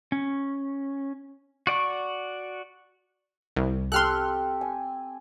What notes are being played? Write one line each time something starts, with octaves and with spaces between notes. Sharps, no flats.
C#4
F#4 D5 F#5 C#6
C2
C4 G4 A4 C6 F6 F#6
G#5